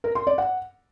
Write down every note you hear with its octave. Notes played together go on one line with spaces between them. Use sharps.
A#4
C6
D5
F#5